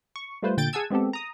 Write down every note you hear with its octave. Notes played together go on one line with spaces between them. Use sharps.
C#6
G3 A3 F4 B4 C5
A#2 D3 G5 G6 A6 D7
G#4 F#5 G#5 A5 E6 G#6
G#3 B3 C4 G4 A4
A#5 D#6